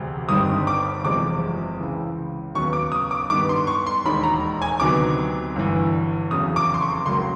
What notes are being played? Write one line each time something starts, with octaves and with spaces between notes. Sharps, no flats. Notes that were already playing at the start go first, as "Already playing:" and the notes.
Already playing: E1 D2 C3
G1 G2 D#3 G3 C4 D#6
D6
F#1 E2 C3 F3 G#3 D6
C#2 C#3 E3
D#2 C#3 F#3 B3 C#6
D6
D#6
D6
G2 D#3 G3 B3 D6
C6
C#6
C6
E1 D#2 D#3 G#3 B5
A#5
G#5
D2 C3 D#3 F#3 B3 D6
G1 G2 E3
F1 E2 C#3 F#3 D#6
D6
C6
C#6
C#2 C#3 F#3 A#3 C6